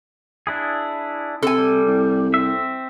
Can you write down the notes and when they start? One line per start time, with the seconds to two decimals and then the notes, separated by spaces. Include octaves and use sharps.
0.47 D4 E4 G#4
1.43 C3 A4 G#5
1.58 G3
1.87 C2
2.34 C4 E5